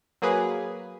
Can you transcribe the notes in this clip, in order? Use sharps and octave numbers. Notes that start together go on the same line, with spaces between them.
F#3 A#3 G#4 B4